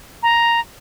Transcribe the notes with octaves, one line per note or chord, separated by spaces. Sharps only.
A#5